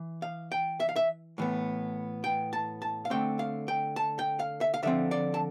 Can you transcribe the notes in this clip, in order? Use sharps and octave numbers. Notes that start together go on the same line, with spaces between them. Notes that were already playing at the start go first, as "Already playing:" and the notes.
Already playing: E3
F5
G5
E5
F5
E5
A2 E3 B3
G5
A5
A5
F5
D3 A3 C4 G5
F5
G5
A5
G5
F5
E5
F5
D3 F3 C4 E5
D5
A5